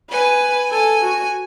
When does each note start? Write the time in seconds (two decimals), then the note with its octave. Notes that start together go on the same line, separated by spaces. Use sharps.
0.10 B4 G#5
0.71 A4 G#5
1.01 F#4